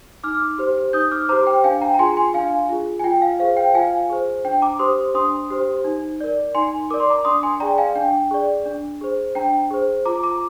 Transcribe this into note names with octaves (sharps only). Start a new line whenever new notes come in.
D#4 D6 F6
G4 C5
D#4 D#6 G6
D6 F6
G4 C5 A#5 D6
G5
D4 F5 G#5
G5 A#5
A#5
F4 G#4 G#5 C6
G#5 C6
D4 F5 G#5
F4 G#4
G#5
F4 G5
F5
G#4 C5 F5
F5
G5
F4 F5 G#5
G#4 C5
D4 G5
A#5 D6
G4 C5 C6 D#6
D4 C6 D#6
G4 C5
D#4
A#4 D5
D#4 G#5 C6
A#4 D5 D6
C6
A#5 D6
D4 C6 D#6
G#5 C6
G#4 D5 G5 A#5
F5 G#5
D4 G5
G#4 D5
D4
G#4 C5
D4 G5 A#5
G#4 C5
F4 A#5 D6
A#5 D6